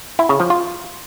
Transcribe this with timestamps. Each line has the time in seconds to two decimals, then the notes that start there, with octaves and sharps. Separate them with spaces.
0.19 E4
0.29 C#3
0.40 F3
0.50 F4